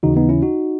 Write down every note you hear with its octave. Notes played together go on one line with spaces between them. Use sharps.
D#2 C#3 E3 D#4 F#4
B3 D#4
C#4 E4
D#4 F#4